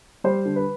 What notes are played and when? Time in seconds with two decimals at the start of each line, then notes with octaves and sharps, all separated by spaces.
0.24 G3 C5
0.45 D3
0.56 B4